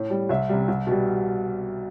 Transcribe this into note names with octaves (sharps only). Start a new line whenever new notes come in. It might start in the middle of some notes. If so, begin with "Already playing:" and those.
Already playing: A2
G3
C2 E5
C3 G3
C2
B2 G3